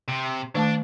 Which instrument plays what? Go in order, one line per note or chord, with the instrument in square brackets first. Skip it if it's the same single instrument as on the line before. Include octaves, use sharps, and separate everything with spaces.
[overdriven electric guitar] C3
[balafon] D#3 A3 A5 [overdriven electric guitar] D4